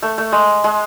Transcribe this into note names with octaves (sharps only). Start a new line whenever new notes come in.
A3
A3
G#3
G#3